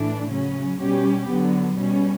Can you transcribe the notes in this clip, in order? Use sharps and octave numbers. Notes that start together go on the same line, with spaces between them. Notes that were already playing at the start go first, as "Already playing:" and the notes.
Already playing: A2 E3 A3 D4
C#3 F#3 C#4
B2 G3 C#4 G4
D3 F#3 B3
B2 G3 C#4